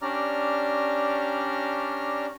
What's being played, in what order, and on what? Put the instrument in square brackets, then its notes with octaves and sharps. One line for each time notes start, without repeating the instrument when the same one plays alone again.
[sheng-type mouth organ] C#4 D4 G4 D5 A#5 F6